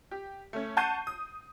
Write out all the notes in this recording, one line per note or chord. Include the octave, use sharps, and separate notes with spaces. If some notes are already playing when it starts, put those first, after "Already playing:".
G4
A3 C#4
F#5 A5 C#6 G6 C7 D#7
D#6